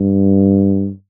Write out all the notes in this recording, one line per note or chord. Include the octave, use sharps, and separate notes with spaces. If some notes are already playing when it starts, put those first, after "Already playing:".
Already playing: G2